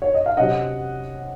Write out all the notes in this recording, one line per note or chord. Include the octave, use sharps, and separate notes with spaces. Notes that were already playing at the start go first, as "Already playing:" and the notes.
C#5
D#5
F5
C3 F#3 C#4 D#5 F#5